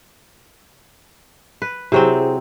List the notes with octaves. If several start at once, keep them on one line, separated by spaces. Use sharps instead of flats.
B4
C3 F#3 C4 E4 G#4 C5